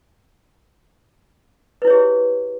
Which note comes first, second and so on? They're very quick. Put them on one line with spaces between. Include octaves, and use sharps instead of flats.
B4 E4 C#5 G#4 G4